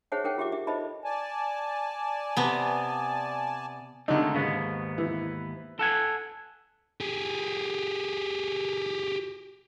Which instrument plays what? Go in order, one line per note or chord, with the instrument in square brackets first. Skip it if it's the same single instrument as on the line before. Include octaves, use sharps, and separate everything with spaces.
[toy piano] G#4 C5 C#5 E5 F#5 A5
G#4 A#4 C#5 F#5 G5
F4 G4 E5 D6
E5
A4 C5 D#5 E5 A5 B5
[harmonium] D5 G#5 A5
[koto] C3 B3
[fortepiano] D3 D#4 [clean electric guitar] D#3 G#3 A3
[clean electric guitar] D#2 G#2 B3 [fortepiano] C#3
[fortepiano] E3
[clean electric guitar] A4 F#5 G#5
[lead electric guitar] G4 G#4